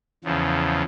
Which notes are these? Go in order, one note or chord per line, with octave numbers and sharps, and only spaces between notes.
E2 C#3 F3